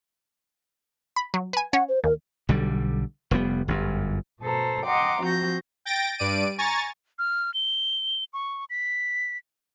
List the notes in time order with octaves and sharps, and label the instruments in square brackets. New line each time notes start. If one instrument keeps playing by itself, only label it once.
[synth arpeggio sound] B5
F#3
B4 G#5
[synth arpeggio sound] C#4 C#5 [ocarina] F#5
[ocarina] C5
[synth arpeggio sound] D#2 [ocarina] A#4
[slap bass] B1 D3 G3
F1 G3 B3
G1 F#2
[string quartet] B2 A4 C5 A#5
D#5 F#5 G5 A#5 C6 D6
F3 C4 F#4 G6 A#6
[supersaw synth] G5 A6 A#6 D7
G2 D5 D7 D#7
G#5 A#5 C#6 A6
[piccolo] F6
G7
C#6
B6